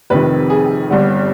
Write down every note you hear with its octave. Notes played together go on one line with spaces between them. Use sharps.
F1 F2 C3 D#3 B4
G#4
G1 G2 D3 G3